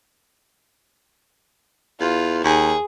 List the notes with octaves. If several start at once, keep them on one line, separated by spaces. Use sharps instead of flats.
E2 F4
D#2 G#4